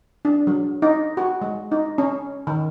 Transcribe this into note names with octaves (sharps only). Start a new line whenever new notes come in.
D4
F#3
D#4
F#4
G#3
D#4
C#4
D#3